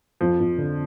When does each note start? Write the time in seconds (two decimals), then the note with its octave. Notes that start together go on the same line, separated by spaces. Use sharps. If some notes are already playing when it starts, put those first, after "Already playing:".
0.21 F2 F3
0.40 F2
0.58 D3